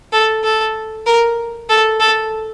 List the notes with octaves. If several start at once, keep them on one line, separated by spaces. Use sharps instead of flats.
A4
A4
A#4
A4
A4